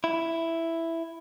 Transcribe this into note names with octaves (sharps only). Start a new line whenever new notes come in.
E4